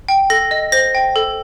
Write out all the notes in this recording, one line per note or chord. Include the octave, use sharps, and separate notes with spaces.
G5
A4 A#6
D#5
C5 A#6
G5
A4